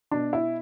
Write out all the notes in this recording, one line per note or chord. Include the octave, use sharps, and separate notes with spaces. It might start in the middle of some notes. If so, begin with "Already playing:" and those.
B2 D4
E4